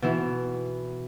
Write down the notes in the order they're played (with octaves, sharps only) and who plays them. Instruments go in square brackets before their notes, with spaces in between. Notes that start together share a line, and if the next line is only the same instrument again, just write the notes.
[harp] B2 E3 E4